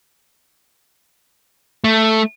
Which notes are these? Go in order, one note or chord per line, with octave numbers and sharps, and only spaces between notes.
A3